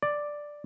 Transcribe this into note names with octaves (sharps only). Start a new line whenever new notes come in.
D5